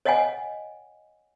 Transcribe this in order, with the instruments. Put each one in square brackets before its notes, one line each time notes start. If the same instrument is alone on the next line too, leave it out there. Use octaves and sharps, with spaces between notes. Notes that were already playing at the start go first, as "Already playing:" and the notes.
[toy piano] C#5 D#5 F5 F#5 G#5